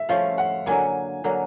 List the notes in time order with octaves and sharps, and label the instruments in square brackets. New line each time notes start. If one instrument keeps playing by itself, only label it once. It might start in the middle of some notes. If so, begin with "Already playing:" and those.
Already playing: [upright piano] E5
[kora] F3 A3 C#4 [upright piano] F5
[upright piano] F#5
[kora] D3 F#3 A#3 [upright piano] G#5
[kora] D3 F#3 A#3